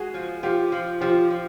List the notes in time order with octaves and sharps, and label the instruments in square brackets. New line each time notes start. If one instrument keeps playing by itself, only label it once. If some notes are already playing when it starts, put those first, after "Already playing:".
Already playing: [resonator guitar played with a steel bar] G#3 [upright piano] F#4 G#4
[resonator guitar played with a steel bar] F3
[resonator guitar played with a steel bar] F3 [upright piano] F4 G4
[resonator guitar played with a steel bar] F3
[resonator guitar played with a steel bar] F3 [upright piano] F4 G4
[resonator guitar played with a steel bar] F3